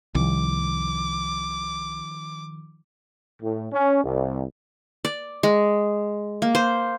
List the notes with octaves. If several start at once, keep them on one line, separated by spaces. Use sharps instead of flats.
C2 D#3 F3 D6
A2
C#4
C2
D5
G#3
A#3
C5